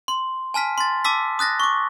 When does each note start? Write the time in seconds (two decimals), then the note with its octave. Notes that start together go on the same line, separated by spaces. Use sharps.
0.08 C6
0.54 G#5 A5 F6 B6
0.78 C6 A6
1.05 A5 D6 E6 B6
1.39 D#6 F#6 A6 A#6
1.60 C#6 D6